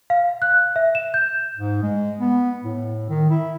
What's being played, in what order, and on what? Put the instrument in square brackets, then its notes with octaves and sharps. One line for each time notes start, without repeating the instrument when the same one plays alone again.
[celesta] F5
F#6
E5
E7
G6
[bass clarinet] G#2
G#3
B3
A2
D#3
E4